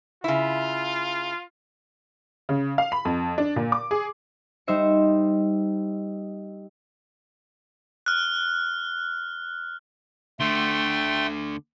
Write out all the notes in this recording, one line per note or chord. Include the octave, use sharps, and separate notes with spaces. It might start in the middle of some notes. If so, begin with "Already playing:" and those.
C#3 E4 F4
C#3
F5
B5
F2
D4
A#2
D6
G#4
G3 D#4 C5 E5 C#7
F6 F#6
D2 D3 A3 G5 C6